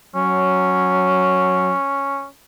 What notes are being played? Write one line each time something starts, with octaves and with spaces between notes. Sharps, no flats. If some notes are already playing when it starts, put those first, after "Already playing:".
F#3 C#4